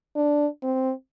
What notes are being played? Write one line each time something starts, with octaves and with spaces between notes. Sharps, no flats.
D4
C4